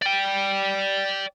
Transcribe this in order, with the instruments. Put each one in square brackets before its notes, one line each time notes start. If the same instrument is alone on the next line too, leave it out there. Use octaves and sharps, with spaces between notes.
[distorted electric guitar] D5 G5